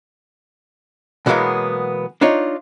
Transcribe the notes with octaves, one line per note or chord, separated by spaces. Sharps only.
B2 E3 F#3 G#3 A#3 B3
D4 D#4 F4 C#5